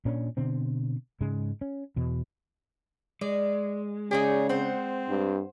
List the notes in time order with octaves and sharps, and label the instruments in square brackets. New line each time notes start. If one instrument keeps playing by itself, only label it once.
[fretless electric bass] A#2 C#4 D4
B2 D3 C4
G#2 C#3 G#3
C#4
E2 B2
[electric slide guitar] G#3 [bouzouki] D5
[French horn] C#3 [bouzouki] D#4 C#5 D5 [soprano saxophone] G#4
[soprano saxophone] C4 [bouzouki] C5 F#5
[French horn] G2